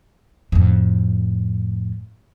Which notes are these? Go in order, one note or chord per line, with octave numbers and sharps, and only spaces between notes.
F2 A2